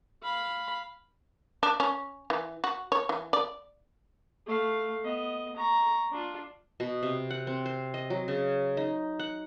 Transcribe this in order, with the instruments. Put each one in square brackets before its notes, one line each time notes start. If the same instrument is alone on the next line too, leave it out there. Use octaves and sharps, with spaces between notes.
[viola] F5 B5
[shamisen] D4
C#4
E3
F#4
C#5
E3
D5
[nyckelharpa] A3 F5
B3 D#5
A#5 C#6
D4 F4
[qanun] B2
C3
F#5
C4
C5
D#5
F#3
C#3
D#4
F#5